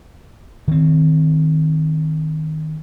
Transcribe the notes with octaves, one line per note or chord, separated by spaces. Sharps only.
D#3 C4